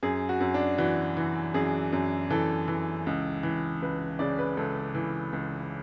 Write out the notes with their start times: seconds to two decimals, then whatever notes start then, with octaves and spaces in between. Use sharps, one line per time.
0.03 F#2 G#4
0.29 F#4
0.40 F#2
0.54 D4
0.78 E3 F#4
1.17 E3
1.54 F#2 G#4
1.92 F#2
2.30 E3 A4
2.68 E3
3.06 C#2
3.43 E3
3.82 C#2 B4
4.19 C#3 D5
4.39 B4
4.57 C#2 A4
4.95 E3
5.33 C#2